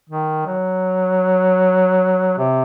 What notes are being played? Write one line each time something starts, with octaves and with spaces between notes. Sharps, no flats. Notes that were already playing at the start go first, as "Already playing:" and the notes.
D#3
F#3
C3